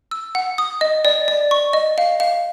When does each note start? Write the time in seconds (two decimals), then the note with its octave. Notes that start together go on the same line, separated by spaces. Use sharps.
0.11 E6
0.35 F#5
0.58 D#6
0.81 D#5
1.05 D5
1.28 D5
1.51 C#6
1.73 D#5
1.98 F5
2.20 F5